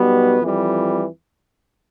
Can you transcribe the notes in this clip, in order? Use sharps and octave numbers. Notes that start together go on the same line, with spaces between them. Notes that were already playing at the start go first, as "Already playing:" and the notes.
Already playing: B1 B2 G3 B3
F2 E3 G3